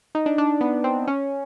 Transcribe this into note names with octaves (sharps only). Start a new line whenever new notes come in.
D#4
D4
D4
B3
C4
C#4